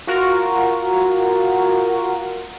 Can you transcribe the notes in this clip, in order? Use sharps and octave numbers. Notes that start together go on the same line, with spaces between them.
F4 F#4 A#4